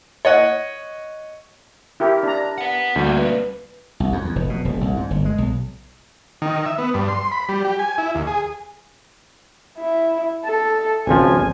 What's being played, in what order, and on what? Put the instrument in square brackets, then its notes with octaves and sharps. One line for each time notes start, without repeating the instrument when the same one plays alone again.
[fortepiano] C#5 D#5 F#5
[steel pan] E4 G4 A#4
D4 A#5
[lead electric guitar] B4 F#5
[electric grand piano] D2 [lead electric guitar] G3 A#3
[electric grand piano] B4
[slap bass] C2
F2
E2
F1
B2
D#1
C2
G#2
G1
G#3
B1
[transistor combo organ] D#3
E5
B3
G2
C6
B5
G3
G4
G#5
E4
D#2
G#4
[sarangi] E4
A4
[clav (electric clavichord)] G#1 C#2 F3 [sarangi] G#5